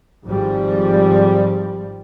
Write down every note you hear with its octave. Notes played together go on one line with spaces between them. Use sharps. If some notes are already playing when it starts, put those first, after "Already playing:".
G#1 F3 G3